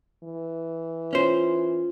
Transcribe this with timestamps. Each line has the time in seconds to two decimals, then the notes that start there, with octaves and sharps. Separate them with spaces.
0.23 E3
1.13 C#4 F4 C5